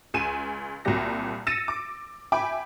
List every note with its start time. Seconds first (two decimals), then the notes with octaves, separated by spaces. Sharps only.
0.14 C#2 G#5 D#7 E7
0.85 C2 A#2 F#3 G3 G4 A#6
1.47 E6 A6 A#6 C#7 D#7 E7
1.68 D6
2.32 E5 G5 G#5 B5 D6